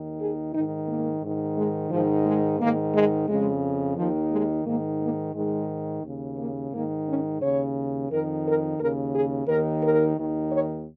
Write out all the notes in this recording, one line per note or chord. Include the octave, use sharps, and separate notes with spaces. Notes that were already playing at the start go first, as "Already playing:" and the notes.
Already playing: D#2 D#3
G#4
G#2 D#3 D#4
A#3
G#2 D#3
G#3
G#2 D#3 F3
G#3
G#2 D#3 A#3
G#3
F2 C#3 G#3
D#2 D#3 F3
G#3
G#2 D#3 A#3
A#3
G#2 D#3 G#3
D#2 C#3
A#3
G#2 D#3 A#3
C#4
D#2 C#3 C#5
F2 D#3 A#4
A#4
D#2 C#3 A#4
G#4
D#2 D#3 A#4
A#4
D#2 D#3
C#5